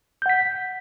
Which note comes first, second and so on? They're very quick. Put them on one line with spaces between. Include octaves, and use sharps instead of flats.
G6 F#5 B6